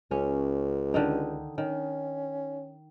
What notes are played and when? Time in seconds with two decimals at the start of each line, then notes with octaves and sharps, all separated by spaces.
0.11 C#2 C#4
0.94 D3 D#3 D#4
1.58 D#3 C#4